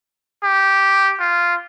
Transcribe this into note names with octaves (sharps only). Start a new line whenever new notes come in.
G4
F4